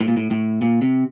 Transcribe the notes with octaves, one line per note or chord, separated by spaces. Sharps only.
A2
A#2
A2
A2
A#2
C3